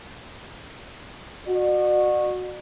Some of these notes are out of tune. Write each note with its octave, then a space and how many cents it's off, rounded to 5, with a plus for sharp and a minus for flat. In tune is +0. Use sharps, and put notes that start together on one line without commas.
F#4 -15 D5 +45